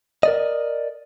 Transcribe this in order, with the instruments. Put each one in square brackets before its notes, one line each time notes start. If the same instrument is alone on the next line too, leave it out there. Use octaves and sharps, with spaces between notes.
[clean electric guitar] A#4 D5 D#5